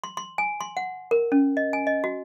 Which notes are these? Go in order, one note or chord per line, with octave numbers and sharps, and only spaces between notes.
C6
C6
G#5
C6
F#5
A#4
C#4
D#5
G#5
D#5
F#4